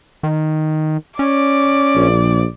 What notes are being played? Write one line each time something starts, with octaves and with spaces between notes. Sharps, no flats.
D#3
C#4 D5
A#1